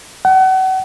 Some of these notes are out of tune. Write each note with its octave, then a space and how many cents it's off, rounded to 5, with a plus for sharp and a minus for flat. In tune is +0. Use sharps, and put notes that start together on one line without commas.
F#5 +35